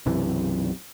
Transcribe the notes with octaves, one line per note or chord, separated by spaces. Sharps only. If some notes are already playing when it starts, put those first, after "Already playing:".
B1 F#2 C3 E3